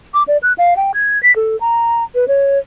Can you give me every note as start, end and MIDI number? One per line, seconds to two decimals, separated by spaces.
0.14 0.23 86
0.28 0.37 74
0.43 0.53 90
0.58 0.74 77
0.77 0.92 79
0.94 1.21 92
1.23 1.34 95
1.36 1.59 69
1.61 2.04 82
2.15 2.25 71
2.28 2.59 73